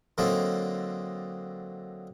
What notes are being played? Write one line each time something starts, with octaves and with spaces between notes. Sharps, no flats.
D3 F#3 A#3 C4 D#4 A4